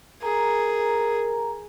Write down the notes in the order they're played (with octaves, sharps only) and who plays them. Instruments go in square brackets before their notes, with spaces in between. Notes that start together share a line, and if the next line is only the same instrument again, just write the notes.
[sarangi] G#4 [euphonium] A#4 [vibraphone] A#5